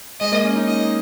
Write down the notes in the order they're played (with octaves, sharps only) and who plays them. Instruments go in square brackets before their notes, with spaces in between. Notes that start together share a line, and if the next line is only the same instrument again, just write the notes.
[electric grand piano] G#3 [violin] D#5
[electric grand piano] A#3
C#4
D#4
[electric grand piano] D#4 [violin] D#5